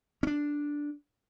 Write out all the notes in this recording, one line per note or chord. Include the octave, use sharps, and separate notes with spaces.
C#4 D4